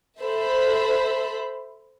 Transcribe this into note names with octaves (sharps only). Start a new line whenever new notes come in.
A4 C5 E5 B5